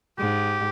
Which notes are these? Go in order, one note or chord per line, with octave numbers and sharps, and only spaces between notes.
G#2 G4